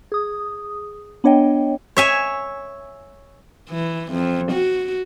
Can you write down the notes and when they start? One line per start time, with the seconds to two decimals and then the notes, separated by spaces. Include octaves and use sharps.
0.12 G#4 D#6
1.24 B3 D4 C#5 D#5 G5
1.97 C#5 E5 G#5
3.70 E3
4.12 F2
4.52 F#4